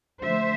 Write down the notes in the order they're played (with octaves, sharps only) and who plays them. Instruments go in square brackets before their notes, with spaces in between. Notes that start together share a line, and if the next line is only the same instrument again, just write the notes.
[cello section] D3 F3 A3 C5 E5